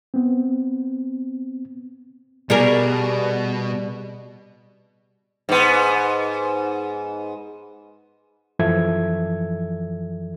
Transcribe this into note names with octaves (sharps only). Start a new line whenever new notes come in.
B3 C4
B2 G3 G#4 A#4
G#2 B3
F#2 E3 F3 A4 E5 G#6